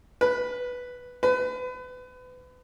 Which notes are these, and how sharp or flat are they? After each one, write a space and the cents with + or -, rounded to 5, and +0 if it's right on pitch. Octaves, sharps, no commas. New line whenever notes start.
B4 +0
B4 +30